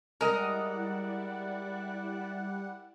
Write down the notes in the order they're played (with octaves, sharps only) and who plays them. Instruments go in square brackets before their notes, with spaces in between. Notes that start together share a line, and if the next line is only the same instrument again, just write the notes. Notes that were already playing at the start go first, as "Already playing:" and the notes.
[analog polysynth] G3 F#5 [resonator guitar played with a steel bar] G#3 D#5 [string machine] E4 D5 [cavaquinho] A#4